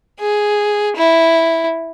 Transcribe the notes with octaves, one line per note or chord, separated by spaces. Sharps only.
G#4
E4